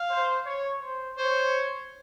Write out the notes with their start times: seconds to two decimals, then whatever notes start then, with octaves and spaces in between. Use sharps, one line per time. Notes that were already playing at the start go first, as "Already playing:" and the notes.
Already playing: F5
0.09 C5
0.45 C#5
0.81 C5
1.17 C5 C#5